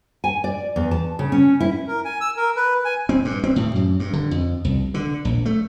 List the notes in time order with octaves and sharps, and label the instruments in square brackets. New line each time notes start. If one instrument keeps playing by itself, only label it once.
[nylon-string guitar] G#5
D5
E2
A5
C#3
C#4
E4
[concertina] A#4
G#5
E6
A#4
B4
G#5
[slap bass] C4
G2
C4
A2
F#2
G2
D3
F2
C2
D3
A#1
A3